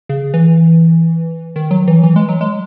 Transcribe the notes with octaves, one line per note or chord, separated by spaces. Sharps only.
C#3
E3
D#3
F#3
E3
E3
G#3
F#3
G#3